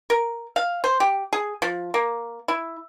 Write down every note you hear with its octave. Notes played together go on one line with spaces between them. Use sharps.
A#4
F5
C5
G4
G#4
F3
A#3
E4